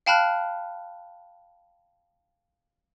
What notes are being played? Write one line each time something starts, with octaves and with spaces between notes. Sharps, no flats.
F5 G5 A5 B5 F6 F#6